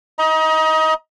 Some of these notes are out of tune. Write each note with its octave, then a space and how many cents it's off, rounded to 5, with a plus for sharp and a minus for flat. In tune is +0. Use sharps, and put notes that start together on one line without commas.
D#5 +20 A#5 +35